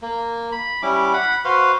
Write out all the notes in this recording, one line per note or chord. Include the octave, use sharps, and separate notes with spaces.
A#3
B5
G3 C#4 E4 D6
F#5 B5
F#4 B4 C5 F5